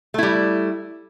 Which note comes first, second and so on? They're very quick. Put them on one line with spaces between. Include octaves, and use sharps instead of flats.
A3 E4 G3